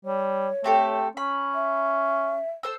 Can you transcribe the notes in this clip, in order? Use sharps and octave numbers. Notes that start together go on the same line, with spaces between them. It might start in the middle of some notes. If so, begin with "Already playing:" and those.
G3 C#5
A3 C4 G4 A4
C#4 B5
E5
A4 C5 E6